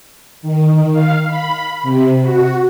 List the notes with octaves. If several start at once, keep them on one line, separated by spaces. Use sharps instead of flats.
D#3
F5
B5
C3
F#4